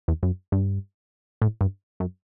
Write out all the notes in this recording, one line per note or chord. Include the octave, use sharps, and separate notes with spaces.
E2
F#2
G2
A2
G2
F#2